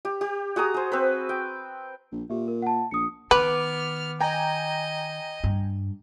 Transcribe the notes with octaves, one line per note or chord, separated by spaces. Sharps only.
G4
G4
F#4 G#4 A#5 D#6
G#4 C5
C4 B4
G5
A#1
A#2 G4 E5
A#4
F#5 A5
A#1 D#6 C#7
D#3 B3 B4 D6 F6
D#5 G5 G#5 A#5
G2